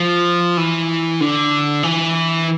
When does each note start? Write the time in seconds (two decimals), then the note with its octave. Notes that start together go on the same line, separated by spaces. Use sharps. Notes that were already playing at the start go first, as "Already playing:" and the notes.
Already playing: F3
0.57 E3
1.21 D3
1.83 E3